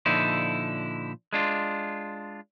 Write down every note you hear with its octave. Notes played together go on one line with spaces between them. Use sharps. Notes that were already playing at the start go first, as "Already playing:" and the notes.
A#2 D3 F3 D#4 E4
G#3 D4 F4